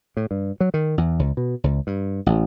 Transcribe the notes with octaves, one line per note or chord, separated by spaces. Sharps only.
A2
G2
F#3
D#3
E2
C#2
B2
C#2
G2
A1